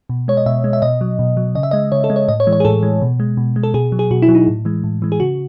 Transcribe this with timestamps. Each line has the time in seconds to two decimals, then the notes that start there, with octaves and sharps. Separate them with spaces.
0.09 B2
0.28 G#3 C#5
0.37 D#5
0.46 B2 E5
0.64 G#3
0.73 E5
0.82 B2 D#5
1.01 F#3
1.19 B2
1.37 F#3
1.55 C#3 D#5
1.63 E5
1.71 G#3 D#5
1.92 C#3 C#5
2.04 A4
2.10 G#3
2.16 C#5
2.28 A2 D#5
2.40 C#5
2.47 E3 G#3
2.53 C#5
2.60 G#4
2.65 A2 A4
2.83 E3 G#3
3.02 B2
3.20 G#3
3.37 B2
3.56 G#3
3.63 A4
3.74 B2 G#4
3.92 F#3
3.99 G#4
4.11 B2 F#4
4.22 E4
4.29 F#3
4.35 D#4
4.47 A2
4.65 E3 G#3
4.84 A2
5.02 E3 G#3
5.12 G#4
5.20 C#3 F#4